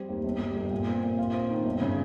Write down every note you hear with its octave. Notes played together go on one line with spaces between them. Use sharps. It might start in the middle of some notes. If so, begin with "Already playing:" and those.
Already playing: G3 C4
D#2
G1
G3
G1
A#2
C4
A#2
F4
C4
D#3
G1
C#3